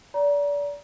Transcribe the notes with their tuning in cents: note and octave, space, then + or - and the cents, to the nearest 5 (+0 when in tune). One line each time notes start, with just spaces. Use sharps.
D5 -30 A#5 +25